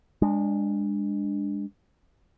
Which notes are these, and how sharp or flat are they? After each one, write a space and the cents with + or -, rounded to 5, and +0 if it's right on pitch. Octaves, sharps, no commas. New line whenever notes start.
G#3 -25 D4 +0